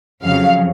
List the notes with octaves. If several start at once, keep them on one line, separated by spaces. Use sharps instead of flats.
F2 C#3 F#3 F5